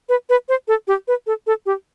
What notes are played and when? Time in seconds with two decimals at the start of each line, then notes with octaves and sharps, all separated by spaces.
0.09 B4
0.29 B4
0.49 C5
0.68 A4
0.87 G4
1.08 B4
1.27 A4
1.47 A4
1.66 G4